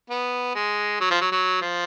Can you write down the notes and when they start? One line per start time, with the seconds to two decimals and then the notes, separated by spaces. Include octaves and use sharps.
0.10 B3
0.55 G#3
1.00 F#3
1.10 F3
1.21 F#3
1.32 F#3
1.61 F3